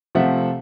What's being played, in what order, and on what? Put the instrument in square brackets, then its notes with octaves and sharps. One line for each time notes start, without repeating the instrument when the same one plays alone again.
[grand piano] C3 F3 A3 E5 F#5